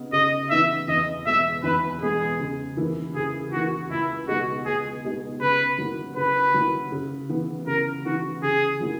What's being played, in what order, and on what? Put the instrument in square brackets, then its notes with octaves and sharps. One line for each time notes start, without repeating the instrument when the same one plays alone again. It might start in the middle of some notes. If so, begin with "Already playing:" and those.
Already playing: [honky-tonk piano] C#3 B3 D#4
[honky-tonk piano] C#3 [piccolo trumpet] D#5
[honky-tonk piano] E3 B3 D#4 [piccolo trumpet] E5
[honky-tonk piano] E2 [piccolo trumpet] D#5
[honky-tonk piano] B2 G#3 B3 [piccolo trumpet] E5
[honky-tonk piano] E2 [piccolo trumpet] B4
[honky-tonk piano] B2 G#3 B3 [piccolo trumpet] G#4
[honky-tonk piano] C#3
E3 A#3 E4
[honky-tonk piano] C#3 [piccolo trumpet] G#4
[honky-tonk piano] E3 A#3 E4 [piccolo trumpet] F#4
[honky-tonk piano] C#2 [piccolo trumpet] E4
[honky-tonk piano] B2 G#3 D#4 G#4 [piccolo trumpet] F#4
[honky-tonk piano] C#2 [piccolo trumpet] G#4
[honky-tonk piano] B2 G#3 D#4 G#4
[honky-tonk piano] C#3 [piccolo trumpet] B4
[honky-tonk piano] F#3 A#3 E4
[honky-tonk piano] C#3 [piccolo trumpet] B4
[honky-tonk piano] F#3 A#3 E4
C#3
E3 B3
[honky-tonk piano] C#3 [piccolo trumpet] A#4
[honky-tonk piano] E3 B3 [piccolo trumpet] F#4
[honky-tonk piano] C#3 [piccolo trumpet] G#4
[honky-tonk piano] F#3 A#3 E4